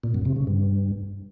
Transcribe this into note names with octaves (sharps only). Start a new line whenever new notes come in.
A#2
F#2
C3
C#3
G2